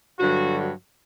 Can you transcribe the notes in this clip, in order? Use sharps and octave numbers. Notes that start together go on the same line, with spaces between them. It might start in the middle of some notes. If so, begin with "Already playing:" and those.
G2 D3 F#3 F#4